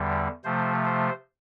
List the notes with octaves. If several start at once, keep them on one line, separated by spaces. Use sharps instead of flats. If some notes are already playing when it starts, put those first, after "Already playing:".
Already playing: E2 D3 G3
C3 F3 A3 C5
C5